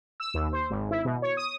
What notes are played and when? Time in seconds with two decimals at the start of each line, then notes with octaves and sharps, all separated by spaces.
0.20 E6
0.34 D#2
0.53 C5
0.70 G#1
0.91 E4
1.05 B2
1.22 C#5
1.37 D#6